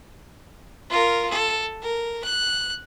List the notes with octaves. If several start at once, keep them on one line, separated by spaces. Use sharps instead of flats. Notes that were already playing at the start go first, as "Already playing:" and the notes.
F4 A#4
A4
A#4
F#6